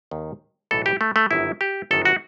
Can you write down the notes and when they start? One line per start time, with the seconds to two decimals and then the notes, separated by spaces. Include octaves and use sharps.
0.11 D#2 D#3
0.71 B1 A2 E3 A4
0.86 G4
1.01 A3
1.16 A3
1.31 G1 F#2 D#3 E4
1.61 G4
1.91 G1 F#2 D#3 A4
2.05 F#4